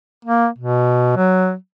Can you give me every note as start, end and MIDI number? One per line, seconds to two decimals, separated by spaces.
0.25 0.47 58
0.58 1.14 47
1.16 1.54 54